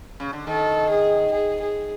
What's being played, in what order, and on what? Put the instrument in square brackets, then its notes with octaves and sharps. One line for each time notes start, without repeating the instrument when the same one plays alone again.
[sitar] C#3
D3
[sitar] D#3 [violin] A4
[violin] G#4
G#4
G#4